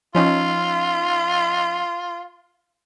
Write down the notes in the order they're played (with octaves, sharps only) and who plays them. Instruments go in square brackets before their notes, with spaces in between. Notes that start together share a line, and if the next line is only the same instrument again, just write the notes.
[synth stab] F3 C#4 D#4 [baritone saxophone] F4